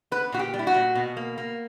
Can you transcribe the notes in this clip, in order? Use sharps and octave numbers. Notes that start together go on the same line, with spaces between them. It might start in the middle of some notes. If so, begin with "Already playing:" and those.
B3 B4
A#2 F#4
G4
G3
E4
F#4
A#2
B2
A#3
A#3